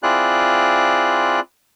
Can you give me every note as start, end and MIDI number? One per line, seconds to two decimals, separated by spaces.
0.03 1.40 60
0.03 1.40 64
0.03 1.40 65
0.03 1.40 68
0.03 1.40 74
0.03 1.40 90